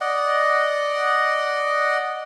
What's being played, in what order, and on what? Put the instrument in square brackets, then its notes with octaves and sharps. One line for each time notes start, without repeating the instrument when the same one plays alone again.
[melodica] D5 D#5 F#5